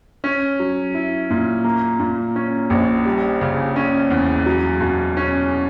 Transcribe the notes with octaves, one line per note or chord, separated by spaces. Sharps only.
C#4
F#3
E4
A#2
A#3
A#2
C#4
A#1
G3
C#3
C#4
E2
F#3
B2
C#4